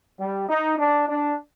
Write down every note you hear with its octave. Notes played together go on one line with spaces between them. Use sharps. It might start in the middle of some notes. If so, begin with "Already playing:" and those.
G3
D#4
D4
D4